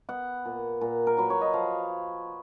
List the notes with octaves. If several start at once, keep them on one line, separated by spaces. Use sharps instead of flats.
B3 F#5
A#2
A#2
A#4
F#3 B4
C#5
D#5
F3 F5